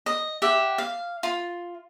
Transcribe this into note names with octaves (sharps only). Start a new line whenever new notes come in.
D#5
G4 E5 F#5
F5
F4